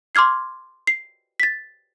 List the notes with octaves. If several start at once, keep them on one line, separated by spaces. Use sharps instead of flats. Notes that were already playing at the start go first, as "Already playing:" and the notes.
C6 D6 F6 G#6 C7
C7
A6 B6